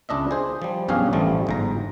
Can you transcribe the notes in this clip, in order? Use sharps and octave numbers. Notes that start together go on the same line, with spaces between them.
C#2 D4 D#5 E5
G#4 C5
F3 G3
B1 G2 C#4 G4 G#4 F5
A1 F3 G3 A3
G1 G#2 A#5